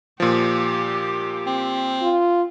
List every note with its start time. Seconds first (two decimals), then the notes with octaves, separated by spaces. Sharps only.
0.20 A#2 F3 G4
1.46 C4
2.02 F4